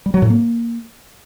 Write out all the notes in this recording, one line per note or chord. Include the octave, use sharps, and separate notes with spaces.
G3
F#3
A2
A#3